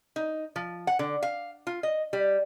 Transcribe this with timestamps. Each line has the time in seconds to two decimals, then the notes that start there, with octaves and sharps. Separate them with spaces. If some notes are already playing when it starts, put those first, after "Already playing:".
0.16 D#4
0.56 F3
0.87 F#5
0.99 D3
1.23 F5
1.67 F4
1.83 D#5
2.13 G3